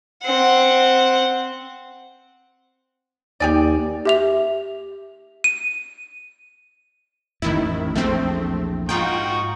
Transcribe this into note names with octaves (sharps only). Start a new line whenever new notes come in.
C4 F#5
D#2 G4 G#4 D5
G4 E5 F7
D#7
A1 F2 D#3 E4
A#1 E2 A3 C4
G#2 D#4 F4 F#4 G5